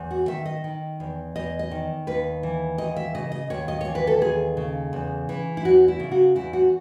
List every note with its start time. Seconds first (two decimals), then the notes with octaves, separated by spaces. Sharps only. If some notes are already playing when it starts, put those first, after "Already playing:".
Already playing: E2
0.11 F#4
0.28 D#3 E5
0.45 D#5
0.64 D#3
1.00 E2
1.36 E2 D#5
1.59 D#5
1.71 D#3
2.07 D#2 B4
2.43 E3
2.78 D#2 D#5
2.96 E5
3.14 C#3 D#5
3.32 D#5
3.50 D#2 C#5
3.68 D#5
3.81 E3 C#5
3.95 B4
4.07 A4
4.22 D#2 G#4
4.57 C#3
4.93 E2
5.29 E3
5.57 E4
5.65 E2 F#4
5.88 E4
6.00 C#3
6.11 F#4
6.36 E2 E4
6.53 F#4